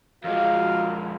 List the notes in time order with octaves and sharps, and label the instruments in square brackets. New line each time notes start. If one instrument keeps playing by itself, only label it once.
[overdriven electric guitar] F2 G#3 [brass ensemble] F4 F#4 A#4 [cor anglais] F5